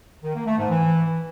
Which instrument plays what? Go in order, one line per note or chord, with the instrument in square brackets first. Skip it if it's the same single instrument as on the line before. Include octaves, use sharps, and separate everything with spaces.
[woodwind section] D#3
A#3
A3
G#2
E3